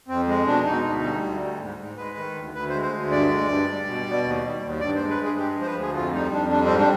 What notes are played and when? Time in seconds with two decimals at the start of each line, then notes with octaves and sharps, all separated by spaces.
0.08 F2 C4
0.27 G#3
0.46 B2 D4
0.66 B2 D#4
0.84 D2
1.03 G3
1.23 D2
1.42 G3
1.59 G#2
1.78 G#2
1.97 G#3 B4
2.17 D#3
2.36 D2
2.54 D2 B4
2.69 G#3 C5
2.82 C5
2.92 D2
3.11 G2 D5
3.30 G#3
3.48 G2
3.68 G3
3.87 B2
4.06 B2
4.24 D#2
4.43 G3
4.62 D#2
4.80 G2 D5
4.95 C5
5.01 G#3
5.09 B4
5.19 G2 G#4
5.38 G#3 G4
5.56 F3
5.62 C5
5.66 B4
5.76 D2 G#4
5.95 F2 F4
6.14 G3 D#4
6.32 F2 D4
6.50 G3 D4
6.66 G#2 C4
6.79 D4